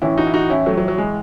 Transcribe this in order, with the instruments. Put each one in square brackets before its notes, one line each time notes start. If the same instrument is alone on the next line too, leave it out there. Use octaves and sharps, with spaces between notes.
[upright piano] A2 E3 C#4 E4
D#4 F#4
E4
D#4 F#4
C#4 E4
F#3 A3
F#3
F#3
G#3